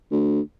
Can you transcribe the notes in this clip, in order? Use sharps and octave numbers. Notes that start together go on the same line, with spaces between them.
D2